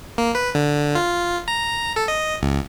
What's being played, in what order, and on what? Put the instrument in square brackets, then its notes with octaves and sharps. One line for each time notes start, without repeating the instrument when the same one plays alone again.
[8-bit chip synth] A#3
B4
D3
F4
A#5
A4
D#5
C#2